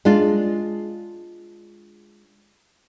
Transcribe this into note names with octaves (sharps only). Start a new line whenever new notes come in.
G#3 D4 F4